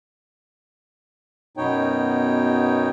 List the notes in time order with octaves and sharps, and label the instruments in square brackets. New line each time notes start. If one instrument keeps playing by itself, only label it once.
[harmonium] F#2 B2 B3 D#4 C#5 G5